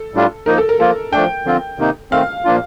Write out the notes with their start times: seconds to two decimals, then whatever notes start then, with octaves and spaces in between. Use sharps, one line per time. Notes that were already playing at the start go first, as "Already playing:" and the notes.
Already playing: A4
0.14 A2 G3 D4 F4
0.46 F3 A#3 D#4 A#4
0.58 A4
0.69 A#4
0.80 F3 A#3 F4 A4
1.12 F3 A3 D4 G5
1.45 D3 F3 C4 F4
1.78 C3 D#3 A#3 D#4
2.11 D#3 A3 C4 F5
2.44 A#2 F3 A#3 D4 F4